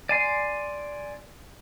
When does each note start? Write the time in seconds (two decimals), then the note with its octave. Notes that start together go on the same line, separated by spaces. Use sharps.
0.09 D5 G#5 C6